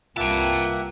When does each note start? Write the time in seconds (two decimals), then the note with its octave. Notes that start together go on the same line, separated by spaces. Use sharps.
0.17 C2 A#3 F4 B4 E5 F#5 G5 A5